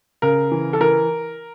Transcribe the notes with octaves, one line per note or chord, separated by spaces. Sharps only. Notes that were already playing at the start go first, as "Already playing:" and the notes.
C#3 A#4
E3
A4
E3 A#4